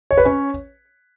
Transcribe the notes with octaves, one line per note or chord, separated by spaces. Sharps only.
C#5
B4
C#4 C#5